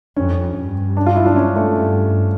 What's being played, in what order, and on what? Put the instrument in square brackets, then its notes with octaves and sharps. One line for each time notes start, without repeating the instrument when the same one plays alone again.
[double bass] F2 [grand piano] C#4
[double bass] G2
[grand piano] D4
F4
E4
D4
C#4
A3
[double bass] G2